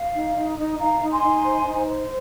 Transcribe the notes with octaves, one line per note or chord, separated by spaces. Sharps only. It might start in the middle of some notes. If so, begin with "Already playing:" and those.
Already playing: F5
D#4
D#4
D#4
D#4 F5 A#5
D#4
G#5 C6
D#4
C5
D#4
C5